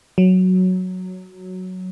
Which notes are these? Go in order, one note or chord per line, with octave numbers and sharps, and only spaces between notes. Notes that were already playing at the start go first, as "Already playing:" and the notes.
F#3